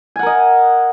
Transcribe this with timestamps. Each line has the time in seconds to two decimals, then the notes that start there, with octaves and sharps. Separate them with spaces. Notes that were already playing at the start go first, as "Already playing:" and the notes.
0.16 G#5
0.19 F#5
0.23 A#4
0.26 D#5